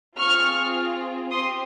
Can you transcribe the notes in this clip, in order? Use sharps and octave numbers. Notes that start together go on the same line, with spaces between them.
C4 F4 G#4 C#6 F6
C4 G4 C6 D#6